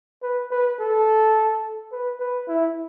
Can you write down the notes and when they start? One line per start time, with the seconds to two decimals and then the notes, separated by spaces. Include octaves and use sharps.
0.23 B4
0.51 B4
0.80 A4
1.92 B4
2.19 B4
2.48 E4